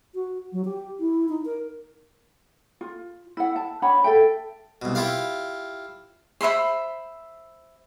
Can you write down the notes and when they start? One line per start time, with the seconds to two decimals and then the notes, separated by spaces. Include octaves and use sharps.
0.15 F#4
0.52 F#3
0.65 G4
0.99 E4
1.29 D#4
1.45 A#4
2.81 F4
3.37 E4 F#5
3.56 A5
3.82 D4 C#5 F#5 B5
4.04 A4 E5 G5
4.82 C2 B2
4.95 E4 F4 G4 F5
6.41 C5 E5 B5 C6